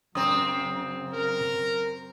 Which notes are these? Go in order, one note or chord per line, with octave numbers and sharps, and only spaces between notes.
F#2 C#3 F#3 C4 D#6
A#4 A#5